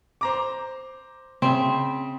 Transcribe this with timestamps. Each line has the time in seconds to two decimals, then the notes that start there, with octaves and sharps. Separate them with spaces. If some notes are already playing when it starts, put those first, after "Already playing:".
0.21 C5 A#5 D6
1.42 C#3 C4 E5